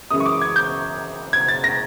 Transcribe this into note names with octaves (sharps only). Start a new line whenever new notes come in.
F#2 C#3 E3 G#3 D#6
C#6
D6
G#6
G6
G#6
A6
A#6